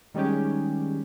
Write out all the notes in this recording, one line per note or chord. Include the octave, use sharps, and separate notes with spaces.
D#3 G3 G#3 C#4 G4